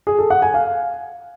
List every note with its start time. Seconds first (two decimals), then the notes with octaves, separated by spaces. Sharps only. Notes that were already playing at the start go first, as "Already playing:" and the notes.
0.07 G#4
0.19 A4
0.30 F#5
0.42 G#5
0.54 F5